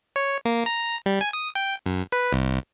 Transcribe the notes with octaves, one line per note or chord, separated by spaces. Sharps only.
C#5
A#3
A#5
G3
G#5
D#6
G5
F#2
B4
C2